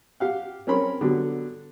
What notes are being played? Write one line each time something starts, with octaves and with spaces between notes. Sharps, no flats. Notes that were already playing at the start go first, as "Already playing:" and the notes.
G4 F5 F#5
C4 C#4 A#4 C#5 B5 C6
D3 F#3 G3 B3